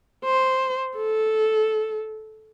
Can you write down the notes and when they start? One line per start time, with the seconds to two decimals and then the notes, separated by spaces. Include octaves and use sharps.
0.24 C5
0.97 A4